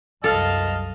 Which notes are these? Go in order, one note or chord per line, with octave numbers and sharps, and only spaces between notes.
C2 F#2 A4 D#5 F5 A5 F6